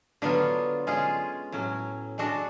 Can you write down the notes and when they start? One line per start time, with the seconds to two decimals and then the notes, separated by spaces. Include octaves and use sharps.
0.22 D3 F#3 B3 F4
0.87 G#3 C#4 F4 G#4
1.52 A2 F#3 C#4
2.18 G#3 D4 F#4 A4